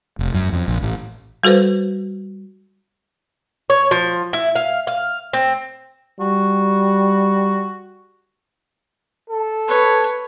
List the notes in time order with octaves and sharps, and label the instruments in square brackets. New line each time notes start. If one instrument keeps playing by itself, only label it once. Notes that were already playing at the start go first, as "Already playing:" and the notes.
[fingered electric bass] F1
F#2
F2
A#1
A1
[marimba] G3 F#4 A4 B4 C5
[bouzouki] C#5
F3
E4
F5
F5
C4
[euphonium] G3 [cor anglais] F#4
[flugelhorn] A4
[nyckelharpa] B4 C#5